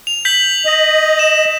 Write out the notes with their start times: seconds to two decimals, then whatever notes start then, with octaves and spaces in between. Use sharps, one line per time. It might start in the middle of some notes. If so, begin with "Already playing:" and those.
0.07 F7
0.25 G6 B6 F#7
0.66 D#5
1.19 E7